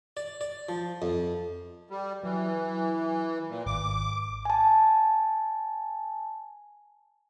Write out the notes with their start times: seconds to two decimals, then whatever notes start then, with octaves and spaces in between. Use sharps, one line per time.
0.17 D5
0.41 D5
0.69 F3
1.02 F2
1.90 G3
2.24 E3 F#3
3.49 A#2
3.66 G#1 D6
4.45 G#5 A5